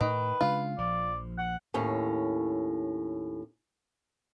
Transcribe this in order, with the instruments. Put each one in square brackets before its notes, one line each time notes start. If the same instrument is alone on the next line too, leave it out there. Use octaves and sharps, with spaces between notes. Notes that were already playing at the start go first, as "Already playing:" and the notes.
[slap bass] A2 [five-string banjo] D#3 [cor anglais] B4
[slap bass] C#3 G#3 D4 [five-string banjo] F4
[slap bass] A#1 F3 [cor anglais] D5
[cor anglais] F#5
[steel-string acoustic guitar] D#2 A2 C#4